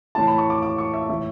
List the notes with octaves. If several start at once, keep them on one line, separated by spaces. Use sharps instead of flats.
A2 E3 A5
B5
C#6
D6
D6
C#6
E5
A2 E3 E5